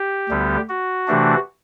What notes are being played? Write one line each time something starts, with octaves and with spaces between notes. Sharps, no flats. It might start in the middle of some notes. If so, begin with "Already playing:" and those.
Already playing: G4
D2 D3 G3 B3
F#4
C3 E3 A3 D4